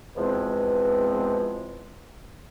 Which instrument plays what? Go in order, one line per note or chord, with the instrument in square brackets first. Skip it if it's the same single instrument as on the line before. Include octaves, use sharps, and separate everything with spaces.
[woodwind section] E2 B2 F3 G#3 C4